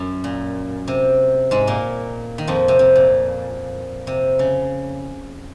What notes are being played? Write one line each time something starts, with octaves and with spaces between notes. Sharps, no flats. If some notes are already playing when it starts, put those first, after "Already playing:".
Already playing: F#2
A#2
C3
G#2 G#3
A#2 A#3
D#3
F2 F3
C3
C3
A#2
C3
C#3